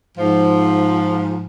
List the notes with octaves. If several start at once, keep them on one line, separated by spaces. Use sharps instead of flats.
G#2 F3